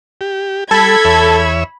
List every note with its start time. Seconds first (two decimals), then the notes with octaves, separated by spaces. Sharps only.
0.21 G4
0.71 G3 A4 B5 G#6
1.05 E2 C#5 E5